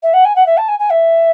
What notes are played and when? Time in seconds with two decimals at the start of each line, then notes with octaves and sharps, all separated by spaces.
0.03 E5
0.13 F#5
0.25 G#5
0.35 F#5
0.46 E5
0.57 A5
0.68 G#5
0.79 G#5
0.90 E5